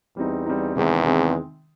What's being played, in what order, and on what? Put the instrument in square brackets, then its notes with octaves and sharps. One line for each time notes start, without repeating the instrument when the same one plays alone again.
[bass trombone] E2 [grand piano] G3 C4 D#4
[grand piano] G3 C4 D#4
[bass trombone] E2 [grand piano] C3 D#3 G#3 C4
[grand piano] C3 D#3 G#3 C4